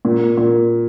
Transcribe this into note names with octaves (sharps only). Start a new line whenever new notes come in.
A#2
A#2